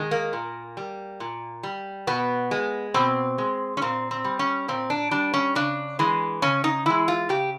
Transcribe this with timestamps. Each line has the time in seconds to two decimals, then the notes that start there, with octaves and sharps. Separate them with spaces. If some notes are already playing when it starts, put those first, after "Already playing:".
Already playing: D#3 G#3
0.11 A#3
0.33 A#2
0.77 G3
1.20 A#2
1.63 G3
2.07 B2 B3
2.51 G#3
2.94 B2 C4
3.38 G#3
3.77 C#4
3.82 A#2 C4
4.11 C4
4.24 G3
4.39 C#4
4.68 A#2 C4
4.90 D4
5.11 G3 D4
5.34 C#4
5.55 C#3 D4
5.99 E3 G#3
6.42 C#3 C#4
6.64 D#4
6.86 E3 G#3 E4
7.08 F4
7.29 C#3 G4